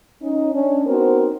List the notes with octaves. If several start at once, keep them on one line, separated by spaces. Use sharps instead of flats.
C#4 D#4
C#4 D4
B3 C4 D#4 F#4 A#4 C5